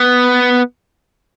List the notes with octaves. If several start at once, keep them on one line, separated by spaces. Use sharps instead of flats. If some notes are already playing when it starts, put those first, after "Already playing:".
Already playing: B3